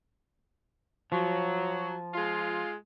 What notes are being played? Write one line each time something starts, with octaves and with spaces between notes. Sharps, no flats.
F3 F#3
G#3 F4